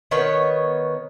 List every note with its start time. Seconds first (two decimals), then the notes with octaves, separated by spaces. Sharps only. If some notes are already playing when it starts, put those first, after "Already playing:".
0.11 D#3 B3 C#5